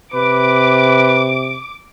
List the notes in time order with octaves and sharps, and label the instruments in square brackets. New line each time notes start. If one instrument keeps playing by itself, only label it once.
[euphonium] C3 [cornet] B4 [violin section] D6